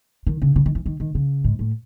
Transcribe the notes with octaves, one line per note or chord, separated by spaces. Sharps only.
D#3
C#3
C#3
D#3
E3
D#3
D#3
C#3
G#2
A2